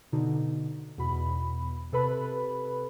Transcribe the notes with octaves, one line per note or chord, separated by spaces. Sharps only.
B2 D3 D#4
E2 B2 B5
C3 A4 B4 B5